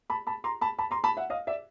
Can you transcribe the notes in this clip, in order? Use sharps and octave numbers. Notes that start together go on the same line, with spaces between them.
A5 B5
A5 B5
A#5 C6
A5 B5
A5 B5
A#5 C6
A5 B5
E5 F#5
D#5 F5
D5 E5